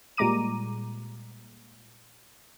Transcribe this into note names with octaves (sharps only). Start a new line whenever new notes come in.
A#2 G3 G#3 A#5 D6 D#7